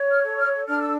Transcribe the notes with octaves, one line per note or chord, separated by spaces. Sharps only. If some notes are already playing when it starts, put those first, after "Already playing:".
Already playing: C#5
F6
A4
F6
D4 F6
E6